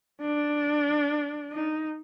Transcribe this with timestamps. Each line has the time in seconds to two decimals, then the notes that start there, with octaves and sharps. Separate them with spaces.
0.21 D4
1.52 D#4